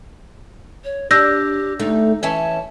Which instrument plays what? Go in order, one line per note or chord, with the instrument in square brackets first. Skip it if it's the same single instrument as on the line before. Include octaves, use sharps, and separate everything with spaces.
[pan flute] C#5
[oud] D4 [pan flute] G4 [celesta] E6 G6 A#6
[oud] D2 A3 [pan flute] D#4
[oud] E3 C#4 E5 [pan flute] A5